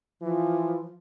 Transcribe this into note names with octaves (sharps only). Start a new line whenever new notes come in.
E3 F3